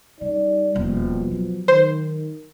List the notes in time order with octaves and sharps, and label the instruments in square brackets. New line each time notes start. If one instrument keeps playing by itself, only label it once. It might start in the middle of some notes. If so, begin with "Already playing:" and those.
[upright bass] C#3 [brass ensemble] G3 D#4 D5
[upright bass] D#1 E2 [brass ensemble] B2 F3
[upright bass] F#3
[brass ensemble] D#3 [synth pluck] C5